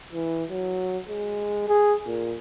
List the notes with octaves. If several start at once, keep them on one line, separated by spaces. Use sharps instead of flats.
E3
F#3
G#3
G#4
A#2